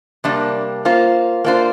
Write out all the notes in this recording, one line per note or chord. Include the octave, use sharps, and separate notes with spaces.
C3 G3 A#3 D4
A#3 F4 C5
A#3 D4 F4 C5